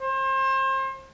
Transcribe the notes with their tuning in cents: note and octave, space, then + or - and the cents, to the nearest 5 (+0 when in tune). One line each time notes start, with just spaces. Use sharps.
C5 +35